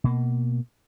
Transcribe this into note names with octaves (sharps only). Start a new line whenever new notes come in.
B2 A#3